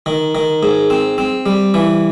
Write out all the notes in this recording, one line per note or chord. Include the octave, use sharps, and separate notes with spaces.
D#3
D#3
G#2
C4
C4
G3
E3